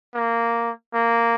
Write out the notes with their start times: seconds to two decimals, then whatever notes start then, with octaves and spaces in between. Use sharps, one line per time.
0.15 A#3
0.94 A#3